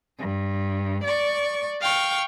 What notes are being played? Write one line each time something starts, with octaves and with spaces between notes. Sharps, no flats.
G2
D5 C#6
F5 G5 C#6